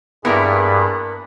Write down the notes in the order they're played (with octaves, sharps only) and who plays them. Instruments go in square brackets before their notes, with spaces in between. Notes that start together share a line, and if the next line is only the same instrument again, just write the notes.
[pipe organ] G2 [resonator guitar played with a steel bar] A#3 A#4 [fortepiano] B3 E4 [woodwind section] G#4 B5